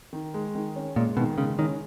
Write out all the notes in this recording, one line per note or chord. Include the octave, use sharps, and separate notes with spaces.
D#3
G#3
D#3
C#4
A#2 G#3
B2 D#3
C#3 G#3
D#3 C#4